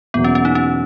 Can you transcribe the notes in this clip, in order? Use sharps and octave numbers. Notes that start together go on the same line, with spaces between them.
E1 E2 B2 F#3 A#3 B3
C#4
C#4
D#4
C#4